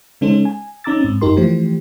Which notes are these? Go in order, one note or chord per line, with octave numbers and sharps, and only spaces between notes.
C#3 G#3 C#4 D#4 A4 C5
G#5
C#4 D#4 A#5 D6 E6 A6
G#2 C4
F#2 D#4 G4 A#4 C6
E3 F3 A3 G4 C5